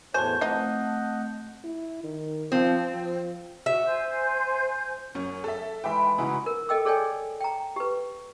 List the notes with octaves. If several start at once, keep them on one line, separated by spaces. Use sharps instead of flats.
E2 A2 F#3 C5 C#5 G#5 A5 G6
E3 F3 A3 C4 D#4 D#5 F#5
E4
D#3
F3 C4
F3
F#4 E5
C5 G#5 G6
F#2 C#4 C#6
A4 E5
E3 G#3 E5 G5
C#3 D#4 E4 F#4 G#4
A#4
A4 D#5 G5 E6
G#4 A4 C#5 D5 G5 G#5
G5 A#5
G4 B4